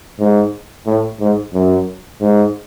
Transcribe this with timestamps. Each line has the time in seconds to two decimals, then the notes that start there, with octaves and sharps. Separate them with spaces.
0.19 G#2
0.86 A2
1.20 G#2
1.54 F#2
2.21 G#2